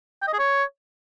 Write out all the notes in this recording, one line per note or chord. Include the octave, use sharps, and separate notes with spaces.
G5
D#5
G#4
C#5